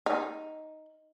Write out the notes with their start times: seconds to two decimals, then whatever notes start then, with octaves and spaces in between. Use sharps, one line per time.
0.06 D#4